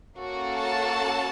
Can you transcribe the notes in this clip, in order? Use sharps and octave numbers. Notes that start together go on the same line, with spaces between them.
A#3 C#4 F#4 A4
A5